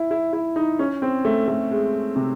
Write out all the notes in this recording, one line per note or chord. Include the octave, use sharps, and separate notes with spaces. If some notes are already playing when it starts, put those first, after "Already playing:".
Already playing: E4
E4
E4
D#4
C#4
C4
A3
A3
G#3
C3